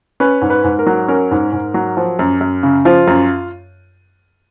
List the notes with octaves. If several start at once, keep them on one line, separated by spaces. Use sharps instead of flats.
C#4 B4
G#2
B4
G#2
A#4
F#3
C#4 A#4
G#2
G#2
F#3
F3
F#2
F#2
C#3
F3 F4
F#2